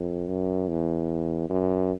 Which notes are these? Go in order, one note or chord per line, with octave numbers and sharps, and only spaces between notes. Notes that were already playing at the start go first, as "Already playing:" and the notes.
Already playing: F2
F#2
E2
F#2